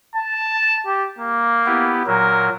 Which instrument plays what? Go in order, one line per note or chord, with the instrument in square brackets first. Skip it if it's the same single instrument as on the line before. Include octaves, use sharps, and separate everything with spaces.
[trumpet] A5
G4
A#3
[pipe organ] B3 E4 G4
[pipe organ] A#2 F#3 [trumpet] A#4